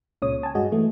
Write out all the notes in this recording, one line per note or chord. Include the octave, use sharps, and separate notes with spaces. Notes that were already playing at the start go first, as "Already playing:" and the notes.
C#2 A#2 C#3 C#5 D#6
G#5 A5
G2 G#3 F#4 D#5
E3 A3